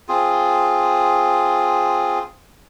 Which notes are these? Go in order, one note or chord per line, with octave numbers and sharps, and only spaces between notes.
C4 F4 G#4